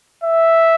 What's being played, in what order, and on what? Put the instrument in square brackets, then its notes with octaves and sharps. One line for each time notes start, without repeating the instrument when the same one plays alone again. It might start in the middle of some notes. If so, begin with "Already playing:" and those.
[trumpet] E5